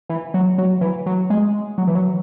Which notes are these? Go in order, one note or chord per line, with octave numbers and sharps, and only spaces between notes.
E3
F#3
F#3
E3
F#3
G#3
F#3
E3
F#3